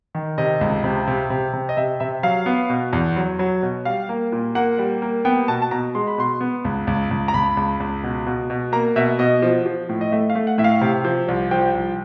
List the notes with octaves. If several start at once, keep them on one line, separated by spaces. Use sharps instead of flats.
D#3
C3 D#5
C#2
C3
C3
C3
C3
D#5
C3 E5
C3 E5
F#3 F5
B3
B2
E2
F#3
F#3
B2
G3 F5
A#3
A#2
A#3 F#5
G3
A#3
B3 G5
B2 A5
A5
B2 A#5
G#3 C6
B5
B2 C6
B3
C#2
C#2
C#2
A#5
C#2 B5
C#2
C#2
B2
B2
B2
A#3 A#5
B2 E5
B2 D#5
F3
F3
A2
D#5
A3 E5
F5
A3
F#5
A2 E5
F5
C3
F3
C2
F3 G5
C2